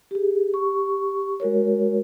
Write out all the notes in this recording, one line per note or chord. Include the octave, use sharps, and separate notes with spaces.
G4 G#4
G4 C#6
G#3 F#4 A#4 C#5